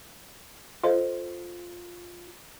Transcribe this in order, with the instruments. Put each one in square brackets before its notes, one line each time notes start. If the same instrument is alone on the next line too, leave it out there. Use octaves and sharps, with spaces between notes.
[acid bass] F4 [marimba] A4 C5 D#5